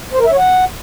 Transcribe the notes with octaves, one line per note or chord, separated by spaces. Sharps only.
C5
A#4
E5
C#5
F#5